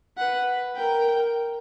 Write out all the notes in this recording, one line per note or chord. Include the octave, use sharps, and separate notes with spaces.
B4 F#5
A#4 G5